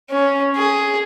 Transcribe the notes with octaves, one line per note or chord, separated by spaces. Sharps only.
C#4
G#4